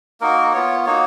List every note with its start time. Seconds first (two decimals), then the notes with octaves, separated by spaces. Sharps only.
0.21 A#3 D#4 F#4 A#4
0.53 B3 F4 C#5
0.86 A#3 D#4 F#4 C#5